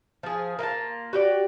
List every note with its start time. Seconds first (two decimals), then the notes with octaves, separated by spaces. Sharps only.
0.23 F3 G#4
0.59 A#3 F4 F#4 A5
1.13 F#4 G4 D5